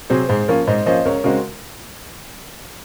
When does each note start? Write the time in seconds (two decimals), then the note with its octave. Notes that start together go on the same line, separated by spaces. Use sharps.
0.10 C3 F#3 C4 G#4 C5
0.29 G#2 G#4 C5
0.48 F3 A#3 C#4 A#4 C#5
0.67 G#2 C5 D#5
0.86 F3 A#3 C#4 C5 D#5
1.05 C#2 A#4 C#5
1.24 C#3 G#3 C4 F#4 A#4